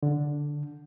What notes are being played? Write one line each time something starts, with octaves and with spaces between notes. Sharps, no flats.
D3